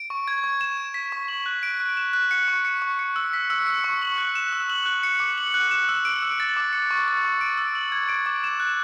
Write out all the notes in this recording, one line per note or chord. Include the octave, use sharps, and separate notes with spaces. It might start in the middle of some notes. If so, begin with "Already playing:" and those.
Already playing: D7
C#6
G#6
C#6
E7
G#6
B6
C#6
F#7
F#6
D7
F#6
E7
F#6
C#7
C#6
C#7
C#6
C#7
E6
B6
E6
C#7
C#6
F#7
F#6
E7
E6
F#7
F#6
C#7
D6
F#7
F#6
E7
E6
D7
E6
A6
D6
C#7
C#6
A6
C#6
D7
E6
F#7
G#6
D7
D6
E7
F#6